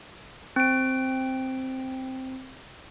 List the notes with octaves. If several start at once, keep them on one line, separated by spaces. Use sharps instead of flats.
C4 D7